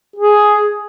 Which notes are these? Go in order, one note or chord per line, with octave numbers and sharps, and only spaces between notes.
G#4